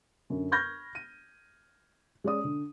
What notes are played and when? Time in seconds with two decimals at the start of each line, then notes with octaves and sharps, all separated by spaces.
0.30 F#2 D3
0.52 B5 C#6 F6 G6 G#6 A#6
0.95 D#7
2.24 G#3 C#4 D5 D#6
2.44 D3